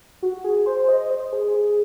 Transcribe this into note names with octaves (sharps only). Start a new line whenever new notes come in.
F#4
G#4
C5
D#5
C5
G#4
G#4